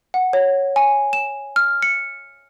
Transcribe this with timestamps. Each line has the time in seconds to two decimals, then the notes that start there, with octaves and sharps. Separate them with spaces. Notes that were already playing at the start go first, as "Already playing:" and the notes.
0.14 F#5
0.33 C#5
0.76 G#5
1.13 E7
1.56 F6
1.83 C#7